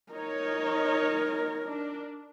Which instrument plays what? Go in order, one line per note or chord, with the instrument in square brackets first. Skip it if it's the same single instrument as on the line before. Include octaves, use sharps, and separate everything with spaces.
[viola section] D#4 C#5 [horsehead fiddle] A#4
[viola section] D4